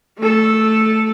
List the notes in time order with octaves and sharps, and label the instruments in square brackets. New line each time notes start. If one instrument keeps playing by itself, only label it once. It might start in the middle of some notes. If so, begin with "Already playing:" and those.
[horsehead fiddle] A3 A4